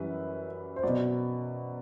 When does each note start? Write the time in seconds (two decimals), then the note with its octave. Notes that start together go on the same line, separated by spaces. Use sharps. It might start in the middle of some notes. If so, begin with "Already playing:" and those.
Already playing: F#2 E3 G3 B4
0.76 C5
0.83 B2 F#3 D5